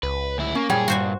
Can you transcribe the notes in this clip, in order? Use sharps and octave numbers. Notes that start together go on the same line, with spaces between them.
C#2 B4
D2 E4
A#3 C#4
F#2 A#2 G3 G#4 C#5 G5
G2 F#4 C5 G#5